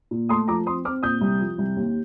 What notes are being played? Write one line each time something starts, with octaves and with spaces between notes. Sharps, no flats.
A#2
A3 C6 D#6
F3 A#5 D6
C4 C6 D#6
C4 D6 F6
A#2 D#6 G6
C2
F3
C2
D#2